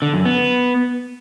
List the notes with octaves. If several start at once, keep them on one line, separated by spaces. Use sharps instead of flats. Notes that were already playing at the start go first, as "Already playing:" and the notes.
D3
F#2
B3